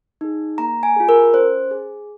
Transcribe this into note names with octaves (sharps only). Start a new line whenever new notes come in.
D#4 G#4
A#3 A#5
G#5
F4 G#4
A#4
C#4 C5
G#4